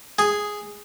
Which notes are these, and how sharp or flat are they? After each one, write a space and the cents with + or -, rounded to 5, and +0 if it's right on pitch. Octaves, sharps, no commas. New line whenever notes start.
G#4 +0 G#5 +0